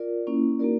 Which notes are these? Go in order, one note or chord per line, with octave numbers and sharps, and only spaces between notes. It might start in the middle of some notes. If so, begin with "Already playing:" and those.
Already playing: F4 A#4 D5
A#3 C#4 E4
A#3 D#4 F#4 A#4 D5